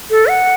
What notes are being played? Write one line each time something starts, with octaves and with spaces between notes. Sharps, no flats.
A4
F#5